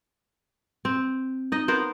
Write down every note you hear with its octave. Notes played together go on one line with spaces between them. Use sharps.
C4
D#4 D#5
B3 A#4 C5